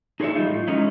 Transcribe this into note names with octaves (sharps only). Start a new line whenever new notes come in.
D#4 G#4 A4 C5 C#5 E5
G3 G#3 D#4 F4
A2
G#3 C#4 D#4 E4